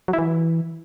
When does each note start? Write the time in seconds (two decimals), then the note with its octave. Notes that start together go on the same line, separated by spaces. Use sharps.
0.08 F#3
0.13 E4
0.19 E3